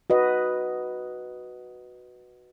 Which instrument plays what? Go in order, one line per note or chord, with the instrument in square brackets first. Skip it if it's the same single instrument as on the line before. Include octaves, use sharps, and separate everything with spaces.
[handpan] F#4 B4 D#5